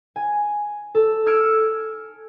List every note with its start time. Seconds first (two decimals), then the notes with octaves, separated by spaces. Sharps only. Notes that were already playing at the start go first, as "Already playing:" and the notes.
0.16 G#5
0.95 A4
1.26 E6 F6 G#6 C#7 D7